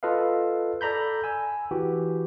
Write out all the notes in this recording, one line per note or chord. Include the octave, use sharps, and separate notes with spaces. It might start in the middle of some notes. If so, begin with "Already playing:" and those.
F4 A4 B4 D#5 F5
A4 D5 A#5 B5 G6
G#5 E6
E3 F#4 G4